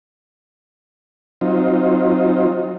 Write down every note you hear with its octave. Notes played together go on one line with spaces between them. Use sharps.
F#3 C4 D#4 F4